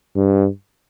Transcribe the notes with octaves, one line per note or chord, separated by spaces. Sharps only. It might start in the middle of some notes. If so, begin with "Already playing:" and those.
G2